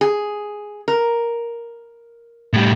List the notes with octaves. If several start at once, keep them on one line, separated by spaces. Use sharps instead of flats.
G#4
A#4
A2 G3